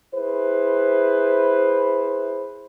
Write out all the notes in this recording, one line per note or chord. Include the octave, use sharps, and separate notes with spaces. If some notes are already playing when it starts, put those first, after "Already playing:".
E4 G#4 B4 C5